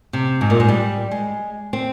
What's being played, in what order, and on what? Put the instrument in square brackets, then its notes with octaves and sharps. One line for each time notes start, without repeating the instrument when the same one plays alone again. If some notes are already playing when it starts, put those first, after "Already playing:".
[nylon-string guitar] C3
G#2
A#2
G#2
G3
G#3
C4